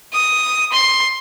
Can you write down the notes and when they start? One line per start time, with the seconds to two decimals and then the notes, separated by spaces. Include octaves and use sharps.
0.13 D#6
0.72 C6